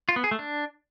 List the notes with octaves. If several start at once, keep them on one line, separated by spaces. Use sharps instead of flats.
F4
B3
G#4
A3
D4